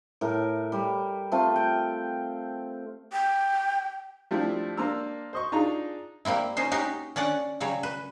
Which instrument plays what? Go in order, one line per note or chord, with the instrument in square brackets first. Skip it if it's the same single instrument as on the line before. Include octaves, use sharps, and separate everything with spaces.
[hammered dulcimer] A2 A#4
G3
A3 C4 F4
G5
[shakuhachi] G5
[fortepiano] F3 G3 A3 C4 D4 E4
A#3 D4 C5 A#5 E6
C5 D#5 C#6
D4 D#4 F4 G#4 A#5
[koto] G3 A#3 C4 E4
C#4 D#4 C5
C#4 D#4 F#4 G4
C#4 D4 D5 F#5
C#3 F#3 G3 C#5
B4